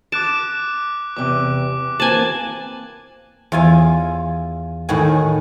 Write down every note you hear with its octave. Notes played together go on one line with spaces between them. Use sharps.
A5 D6 F#6 D7
E2 C3 D6
E3 A#3 C4 G#5 A5 F#7
E2 F4 G#5
A2 D#3 F#4 G#5